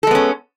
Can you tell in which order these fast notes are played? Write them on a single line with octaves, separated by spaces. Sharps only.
A4 G#3 B3 C#4